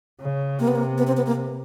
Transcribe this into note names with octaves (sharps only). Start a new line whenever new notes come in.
C#3
C3 A#3
B3
A#3
B3
C4
B3
A#3